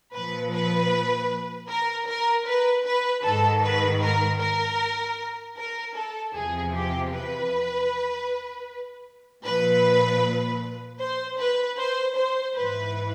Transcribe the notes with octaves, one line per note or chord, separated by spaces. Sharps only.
A#2 F3 B4
B4
A#4
A#4
B4
B4
G#2 D#3 A4
B4
A#4
A#4
A#4
A4
E2 C3 F3 G#4
G4
B4
A#2 F3 B4
C5
B4
C5
C5
G#2 E3 B4